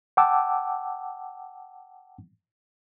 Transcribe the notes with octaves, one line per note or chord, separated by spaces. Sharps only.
F#5 G5 A5 D6 E6